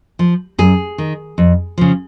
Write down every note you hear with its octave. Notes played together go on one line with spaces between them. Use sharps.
F3
F#2 G#4
D#3
F2
C#3 F3